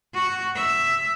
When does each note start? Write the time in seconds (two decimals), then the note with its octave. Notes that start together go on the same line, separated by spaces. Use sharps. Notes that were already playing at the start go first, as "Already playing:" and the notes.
0.14 F#4
0.56 E5